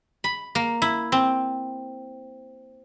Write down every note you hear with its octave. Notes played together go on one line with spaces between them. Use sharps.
B5
A#3
E4
C4